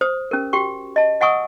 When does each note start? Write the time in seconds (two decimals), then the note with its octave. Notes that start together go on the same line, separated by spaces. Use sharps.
0.01 C5 D#6
0.31 C#4 G4 A#4
0.53 F#4 G4 G5 C#6
0.96 D#5 A5
1.21 D#5 F#5 G#5 C#6 D#6 E6